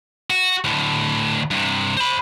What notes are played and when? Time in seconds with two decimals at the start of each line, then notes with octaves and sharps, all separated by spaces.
0.30 F#4
0.64 D2 A2
1.51 G2 C3
1.97 C5 B5